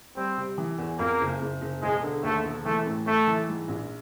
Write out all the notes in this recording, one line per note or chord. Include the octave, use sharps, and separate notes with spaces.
G3 C4
C3
E3
E2
F2 A#3
F#1
F#1
F#1
E1 G#3
D3
D#2 A3
E1
E3 A3
A2
A2 A3
E3
G#2
A#1